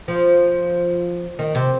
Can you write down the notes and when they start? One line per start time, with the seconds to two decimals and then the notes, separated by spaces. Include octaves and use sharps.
0.08 F3
1.39 D#3
1.55 C3